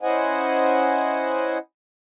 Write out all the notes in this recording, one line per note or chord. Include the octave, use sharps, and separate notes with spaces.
C#4 E4 C5 D#5 F#5 G#5